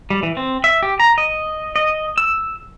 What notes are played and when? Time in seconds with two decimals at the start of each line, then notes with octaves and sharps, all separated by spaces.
0.10 G3
0.23 E3
0.37 C4
0.64 E5
0.83 G4
1.00 A#5
1.18 D#5
1.76 D#5
2.18 E6